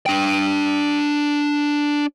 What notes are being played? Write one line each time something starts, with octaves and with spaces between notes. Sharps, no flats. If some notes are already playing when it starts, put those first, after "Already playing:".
D4 G5